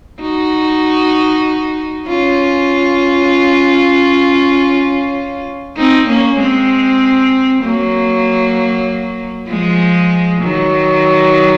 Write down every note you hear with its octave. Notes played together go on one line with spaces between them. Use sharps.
D#4 F#4
C#4 F4
C4 D#4
A#3 C#4
G#3 C4
F#3 A#3
F3 G#3
D#3 F#3